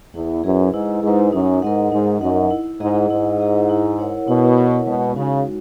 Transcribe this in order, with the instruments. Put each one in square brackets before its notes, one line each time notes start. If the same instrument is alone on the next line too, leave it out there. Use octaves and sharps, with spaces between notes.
[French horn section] E2 [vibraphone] E4
[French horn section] F#2 [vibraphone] G#4 B4
[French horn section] G#2 [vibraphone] E4
[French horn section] G#2 [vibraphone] G#4 B4
[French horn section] F#2 [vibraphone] D#4
[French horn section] G#2 [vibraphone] A#4 D#5 F#5
[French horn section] G#2 [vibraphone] D#4
[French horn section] F#2 [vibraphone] A#4 D#5 F#5
[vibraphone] E4
[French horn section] G#2 [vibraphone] G#4 D#5 F#5
[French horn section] G#2 [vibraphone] E4
[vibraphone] G#4 D#5 F#5
E4
A#4 C#5 F#5
[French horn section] B2 [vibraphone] E4
[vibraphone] A#4 C#5 F#5
[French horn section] B2 [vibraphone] G#3
[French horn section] C#3 [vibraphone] D#4 F#4